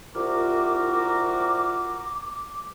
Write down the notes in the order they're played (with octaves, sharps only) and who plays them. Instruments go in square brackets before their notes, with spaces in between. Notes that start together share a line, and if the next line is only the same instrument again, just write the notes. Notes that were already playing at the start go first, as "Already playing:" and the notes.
[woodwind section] C2 [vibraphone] F4 [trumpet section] F#4 A#4 [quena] D6